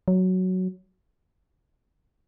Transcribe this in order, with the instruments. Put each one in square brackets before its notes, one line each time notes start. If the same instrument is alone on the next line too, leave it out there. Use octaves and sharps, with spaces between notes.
[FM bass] F#3